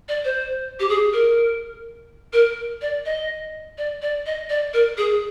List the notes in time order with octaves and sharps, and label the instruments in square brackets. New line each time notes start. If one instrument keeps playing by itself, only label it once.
[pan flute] D5
C5
G4
G#4
A#4
A#4
D5
D#5
D5
D5
D#5
D5
A#4
G#4